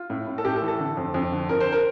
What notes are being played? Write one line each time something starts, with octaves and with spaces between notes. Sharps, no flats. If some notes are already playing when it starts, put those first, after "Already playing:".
Already playing: F4
A2
A2
A4
A2 G4
A4
E3
A4
D3
F2
F2
D3
F2 A#4
C5
A#4